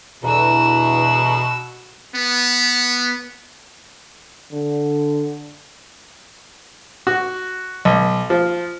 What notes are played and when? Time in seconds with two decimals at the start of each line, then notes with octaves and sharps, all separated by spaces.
0.23 E2 B2 D3 E3 F#4 A#5 E6
2.15 B3
4.52 D3
7.07 F#4
7.85 B1
8.30 F3